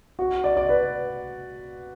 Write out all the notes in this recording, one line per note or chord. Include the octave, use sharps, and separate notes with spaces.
F#4
D5
D5
B4